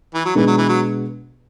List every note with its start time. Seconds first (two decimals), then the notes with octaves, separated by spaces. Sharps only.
0.14 E3
0.25 F#3
0.35 B2 E3 G#3 B3 D4
0.47 F#3
0.57 E3
0.68 F#3